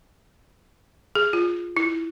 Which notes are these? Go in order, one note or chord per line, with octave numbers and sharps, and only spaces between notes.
G#4
F4
E4